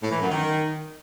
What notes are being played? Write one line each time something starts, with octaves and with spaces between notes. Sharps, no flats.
A2
E3
F#2
D#3